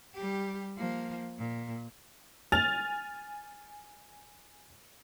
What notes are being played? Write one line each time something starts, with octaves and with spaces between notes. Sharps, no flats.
G3 G4
F3 A#3
A#2
G#5 F6 A6 F7